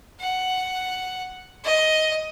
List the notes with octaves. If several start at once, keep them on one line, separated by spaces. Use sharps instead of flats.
F#5
D#5